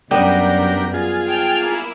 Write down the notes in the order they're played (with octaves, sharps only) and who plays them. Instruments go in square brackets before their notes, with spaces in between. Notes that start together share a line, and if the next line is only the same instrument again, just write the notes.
[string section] F#2 [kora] G3 B3 [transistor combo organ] D4 G4 A#4
[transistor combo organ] F4 G#4
[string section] G5 A5 F6
A#3 E4